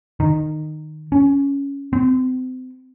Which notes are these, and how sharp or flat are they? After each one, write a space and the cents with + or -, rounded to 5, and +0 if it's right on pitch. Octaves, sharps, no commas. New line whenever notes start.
D#3 -15
C#4 +10
C4 -35